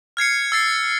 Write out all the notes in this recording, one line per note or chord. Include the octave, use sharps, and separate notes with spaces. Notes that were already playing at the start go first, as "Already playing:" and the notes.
F6 G#6 C7 C#7
E6 A6 C7